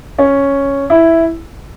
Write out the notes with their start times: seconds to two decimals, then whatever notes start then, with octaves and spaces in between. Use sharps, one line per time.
0.18 C#4
0.90 E4